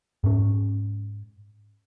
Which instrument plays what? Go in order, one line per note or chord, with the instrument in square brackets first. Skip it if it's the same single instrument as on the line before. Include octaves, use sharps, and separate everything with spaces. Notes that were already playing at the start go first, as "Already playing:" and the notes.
[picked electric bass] G#2 C#4